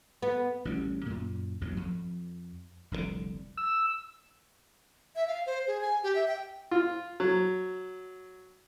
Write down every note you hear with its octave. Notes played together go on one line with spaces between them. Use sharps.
B3
A1 D2 G3 C#4
F#2 A#2
A1 E2 G2 F#3
F2
F1 C2 G#2 D3
E6
E5
F5
C5
G#4
G#5
G4
E5
G5
F4
F#3